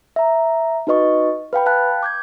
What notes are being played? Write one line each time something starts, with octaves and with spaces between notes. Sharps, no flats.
E5 A#5
D#4 F#4 B4 D#5 C#6
B4 F5 G5 B5
F5 G5 A5 F#6
D6 G6 G#6